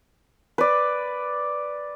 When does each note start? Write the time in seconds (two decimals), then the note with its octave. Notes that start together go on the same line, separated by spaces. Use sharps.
0.58 B4 D5